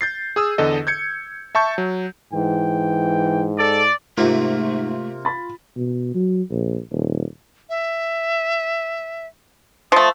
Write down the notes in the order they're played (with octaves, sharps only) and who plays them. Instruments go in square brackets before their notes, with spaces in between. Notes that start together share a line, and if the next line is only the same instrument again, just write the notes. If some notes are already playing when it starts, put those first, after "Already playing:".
[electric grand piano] G6 A6 C7
G#4 D#6 E6
E2 D3 A4 D#5
G6 G#6 C#7
E5 A5 C#6 G6
F#3
[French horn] G#2 [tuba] E3 [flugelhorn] G5
[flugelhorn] A4 [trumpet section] D5
[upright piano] G#2 [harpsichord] C3 A#3 [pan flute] A3 [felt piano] F4
[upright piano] B5 A6
[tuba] B2
F#3
A#1
D#1
[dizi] E5
[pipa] F3 A3 [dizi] D#6